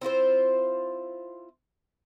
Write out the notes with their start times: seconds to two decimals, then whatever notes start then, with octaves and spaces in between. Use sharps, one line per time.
0.01 C4 E4 F4 C5